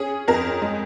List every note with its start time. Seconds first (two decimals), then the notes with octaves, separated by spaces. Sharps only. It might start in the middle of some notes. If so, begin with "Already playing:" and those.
Already playing: C#4 G#4
0.28 F2 A#4
0.62 G#3